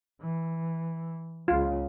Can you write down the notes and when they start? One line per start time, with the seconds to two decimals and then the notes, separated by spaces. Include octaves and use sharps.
0.21 E3
1.48 C#2 C#3 F4